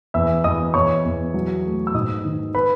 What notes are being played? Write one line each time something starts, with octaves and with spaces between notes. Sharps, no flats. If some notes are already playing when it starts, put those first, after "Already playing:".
E2 E5 E6
E2 D#5 D#6
E2 C#5 C#6
E2
F#3
A3
E6
G#2 D#5 D#6
D#3
B4 B5